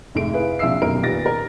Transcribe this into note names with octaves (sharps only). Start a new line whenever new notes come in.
F1 G#2 A3 D7
E4 G#4 B4 F5
A#1 C3 E5 F5 E6 C7
F1 F#2 B2 D#3 A#4 D7
A#2 D#3 B3 G4 A6 A#6
A#4